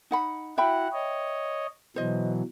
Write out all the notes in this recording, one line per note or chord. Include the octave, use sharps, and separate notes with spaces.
D#4 F#5 B5
E4 F#4 E5 F#5 G5 B5
C#5 D#5
B2 E3 F#3 C5 D#5